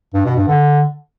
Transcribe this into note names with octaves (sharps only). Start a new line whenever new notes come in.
G2
B2
G2
D3